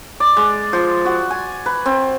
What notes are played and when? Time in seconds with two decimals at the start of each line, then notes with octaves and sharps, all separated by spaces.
0.20 D5
0.37 G#3
0.73 F3
1.05 F#4
1.31 G#5
1.66 B4
1.86 C4